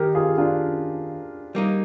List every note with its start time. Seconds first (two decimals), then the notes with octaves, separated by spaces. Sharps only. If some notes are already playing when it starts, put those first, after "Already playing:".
Already playing: D#3 A#3 D#4 G4 A#4
0.15 F4 G#4
0.38 D4 F4
1.55 G3 A#3 D#4